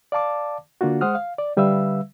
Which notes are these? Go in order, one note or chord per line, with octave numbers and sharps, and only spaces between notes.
D5 F5 A5 D6
D3 A#3 D4 F4 F#4
G#3 C5 F#5 D#6 F6
F5
D5
D3 G3 B4 E5 F5 E6